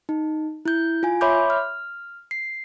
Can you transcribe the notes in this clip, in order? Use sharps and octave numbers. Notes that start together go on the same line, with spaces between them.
D#4
E4 G6
F4 G#5
C#5 E5 B5 C6 D6 G6
F6
C7